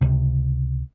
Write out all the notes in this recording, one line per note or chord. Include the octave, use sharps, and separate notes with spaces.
C#2 C3